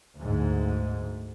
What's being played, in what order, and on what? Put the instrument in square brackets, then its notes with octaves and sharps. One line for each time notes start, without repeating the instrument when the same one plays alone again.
[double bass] D2 G#2